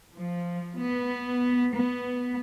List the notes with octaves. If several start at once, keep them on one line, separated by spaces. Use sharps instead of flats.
F3
B3
B3